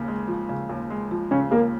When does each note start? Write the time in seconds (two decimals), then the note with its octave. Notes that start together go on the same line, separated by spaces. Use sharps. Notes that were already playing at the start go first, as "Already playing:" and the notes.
Already playing: D#2 C#3
0.08 G#3
0.28 F3
0.49 C#3
0.69 D#2
0.90 G#3
1.11 F3
1.31 C#3 C#4
1.51 D#2 A#3